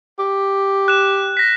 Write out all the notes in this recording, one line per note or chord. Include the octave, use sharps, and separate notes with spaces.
G4
F#6 E7
A#6 B6